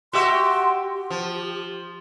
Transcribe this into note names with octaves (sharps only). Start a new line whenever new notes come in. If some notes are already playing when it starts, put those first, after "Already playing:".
F#4 G4 E5 C6
G4
F3